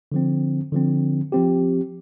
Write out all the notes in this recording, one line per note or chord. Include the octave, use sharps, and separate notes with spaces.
D3 F3 C4
D3 F3 C4
F3 C4 G4